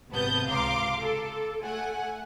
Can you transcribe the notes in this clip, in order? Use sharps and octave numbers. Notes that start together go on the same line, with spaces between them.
G#1 C3 B3 A5 D#6 G6
C#2 F5 A#5 C6 D6
A4
A3 F#5 G#5